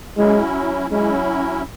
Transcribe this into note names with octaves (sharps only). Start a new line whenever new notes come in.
F#3 G#3 C#4 E4
F#3 G#3 C#4 E4